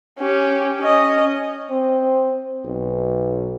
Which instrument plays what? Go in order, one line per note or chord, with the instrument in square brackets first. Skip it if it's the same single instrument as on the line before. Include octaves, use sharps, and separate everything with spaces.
[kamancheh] C#4 G4
C#4 D#5
[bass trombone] C4
B1